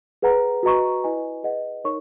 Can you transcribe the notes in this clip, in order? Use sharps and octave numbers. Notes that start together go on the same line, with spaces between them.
G#4 B4 F#5 A#5
F#4 B4 D#5 A#5 C#6
E4 B4 D#5 G#5
G#4 B4 D#5 F#5
D#4 A#4 C#5 C#6